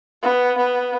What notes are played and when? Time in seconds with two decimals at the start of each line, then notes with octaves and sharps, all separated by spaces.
0.23 B3
0.58 B3